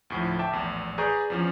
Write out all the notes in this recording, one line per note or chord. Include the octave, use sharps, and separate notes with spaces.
D2 A2 F3
E5 G5 A5 D6
A#1 E2 A2
G#4 B4 D5 A#5 C#6 G6
E2 F3 C#4